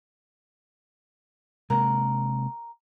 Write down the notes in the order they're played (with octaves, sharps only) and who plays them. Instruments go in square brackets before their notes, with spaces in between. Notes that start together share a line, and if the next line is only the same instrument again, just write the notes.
[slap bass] C3 G#3 A#3 [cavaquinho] A#4 F#5